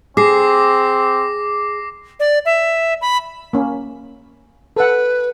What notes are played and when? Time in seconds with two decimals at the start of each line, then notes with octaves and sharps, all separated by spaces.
0.17 C4 G#4 D6 A#6 C7
2.20 D5
2.45 E5
3.01 B5
3.53 A#3 C#4
4.76 A4 B4 F#5